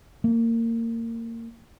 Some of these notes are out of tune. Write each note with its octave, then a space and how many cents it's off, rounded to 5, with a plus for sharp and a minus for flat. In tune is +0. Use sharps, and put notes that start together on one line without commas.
A#3 -25